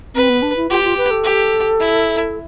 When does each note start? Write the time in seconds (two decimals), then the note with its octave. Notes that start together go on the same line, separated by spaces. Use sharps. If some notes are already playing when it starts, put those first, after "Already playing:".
0.15 C4 B4
0.29 B3
0.42 D4
0.56 E4
0.70 F4 G4
0.84 F4
0.97 B4
1.11 A4
1.24 G4
1.80 E4